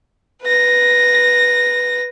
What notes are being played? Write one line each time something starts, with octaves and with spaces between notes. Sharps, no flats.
B4 A#6